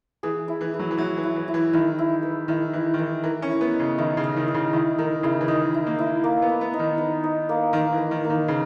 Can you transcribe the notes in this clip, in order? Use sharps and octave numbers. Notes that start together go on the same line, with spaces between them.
E3 G#4
E4
E3
B4
F#3
E3
F#3 E4
E3
E4
E3
E4
E3
D#3 E4
E4
B4
D#3 E4
E3 E4
D#3
E3 E4
E3 A#4
C#4
E4
B3
D#5
C#3
D#3 E4
C#3
D#5
D#3
D#5
C#3
D#3 E4
D#3 A#4
C#3 E4
E3
D#3 D#5
E4
A#3
E4
A#3
B3
B4
B3
D#4
D#3
B4
D#4
A#3
D#3 A#3
E3
B4
D#3
A#3
D#3
C#3 B4